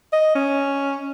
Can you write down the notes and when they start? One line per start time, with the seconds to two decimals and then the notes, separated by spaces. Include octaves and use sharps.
0.13 D#5
0.35 C#4